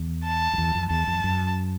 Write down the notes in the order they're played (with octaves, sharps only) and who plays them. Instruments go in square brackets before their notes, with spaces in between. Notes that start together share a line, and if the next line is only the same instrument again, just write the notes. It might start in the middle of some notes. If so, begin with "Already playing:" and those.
Already playing: [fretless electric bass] E2
[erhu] A5
[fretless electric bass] F2
E2
F2
[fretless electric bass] E2 [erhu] A5
[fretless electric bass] F2
F#2